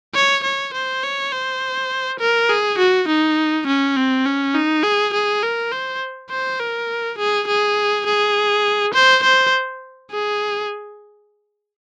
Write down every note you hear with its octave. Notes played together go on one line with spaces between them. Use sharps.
C#5
C#5
C5
C#5
C5
A#4
G#4
F#4
D#4
C#4
C4
C#4
D#4
G#4
G#4
A#4
C5
C5
A#4
G#4
G#4
G#4
C5
C5
G#4